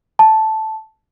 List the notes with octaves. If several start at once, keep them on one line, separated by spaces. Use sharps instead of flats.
A5